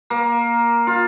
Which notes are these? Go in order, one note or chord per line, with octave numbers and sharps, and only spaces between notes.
A#3
F4